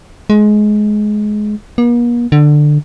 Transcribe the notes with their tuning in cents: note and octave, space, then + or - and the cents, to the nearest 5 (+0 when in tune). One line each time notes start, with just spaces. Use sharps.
G#3 +20
A#3 +45
D3 +15